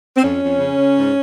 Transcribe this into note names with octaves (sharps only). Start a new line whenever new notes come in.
C4
F2 C#4
F2
C#3
C#3
G#2